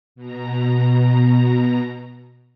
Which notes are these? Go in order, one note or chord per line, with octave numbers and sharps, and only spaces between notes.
B2 A#5